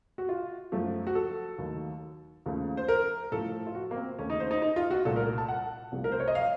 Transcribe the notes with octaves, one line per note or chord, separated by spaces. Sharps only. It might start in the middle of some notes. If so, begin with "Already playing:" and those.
F#4
F4
F#2 F3 A3
F#4
A4
D#2 D#3 F#3 A3
D#2 C#3 F3 A3
C5
A#4
A2 F3 A3 A4
F4
F#4
A#3
C4
D#2 C#3 A3 C#4
D#4
C5
D#4
D#4
F4
F#4
C2 A#2 A3 A4
A#4
A5
F#5
C2 C3 F3 A3
A#4
C5
C#5
D#5
F5